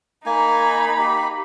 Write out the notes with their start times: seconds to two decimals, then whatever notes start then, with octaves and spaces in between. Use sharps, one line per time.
0.26 A#3 D#4 G#5 B5
0.99 G4